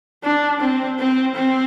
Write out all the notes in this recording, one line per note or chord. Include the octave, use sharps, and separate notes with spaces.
D4
C4
C4
C4